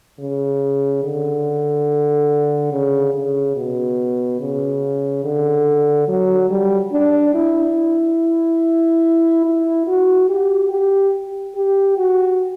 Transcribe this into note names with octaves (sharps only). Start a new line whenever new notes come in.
C#3
D3
C#3
C#3
B2
C#3
D3
F#3
G3
D4
E4
E4
F#4
G4
G4
G4
F#4